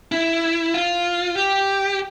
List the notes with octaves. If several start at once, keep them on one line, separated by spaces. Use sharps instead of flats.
E4
F4
G4